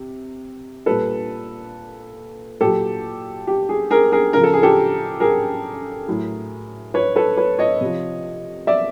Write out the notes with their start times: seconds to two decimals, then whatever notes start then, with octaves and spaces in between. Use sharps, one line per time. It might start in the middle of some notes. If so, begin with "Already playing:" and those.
Already playing: C3
0.86 A#2 G3 A4 B4
2.61 A#2 F#3 G4 A4
3.47 G4
3.69 G#4
3.91 G#4 A#4
4.12 G#4 A#4
4.33 C#3 F3 A#4
4.44 A4
4.53 G#4
4.63 G4 A4
5.20 G#4 A#4
6.08 A2 F#3
6.94 B4 C#5
7.16 A4 B4
7.37 B4 C#5
7.59 C#5 D#5
7.81 C3 F3
8.67 D5 E5